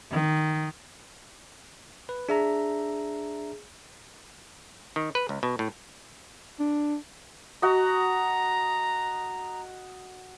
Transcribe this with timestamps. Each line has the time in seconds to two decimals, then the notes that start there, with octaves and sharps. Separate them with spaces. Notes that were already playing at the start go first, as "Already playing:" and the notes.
0.12 D#3
2.09 B4
2.29 D4 G#4 E5 A#5
4.96 D#3
5.15 B4
5.29 C#2
5.43 B2
5.59 A2
6.60 D4
7.62 F#4 D#5 A#5